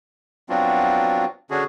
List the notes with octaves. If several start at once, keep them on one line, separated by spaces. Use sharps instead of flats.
F#3 B3 C4 D4 F4 F#4
D3 C#4 D4 F#4 G#4